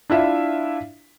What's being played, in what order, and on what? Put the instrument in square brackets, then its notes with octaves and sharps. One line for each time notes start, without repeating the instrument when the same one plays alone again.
[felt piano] D4 E4 F4 E5